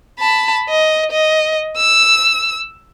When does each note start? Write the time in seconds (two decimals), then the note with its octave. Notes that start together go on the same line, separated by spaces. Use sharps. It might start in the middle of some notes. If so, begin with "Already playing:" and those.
0.19 A5 B5
0.69 D#5
1.12 D#5
1.77 E6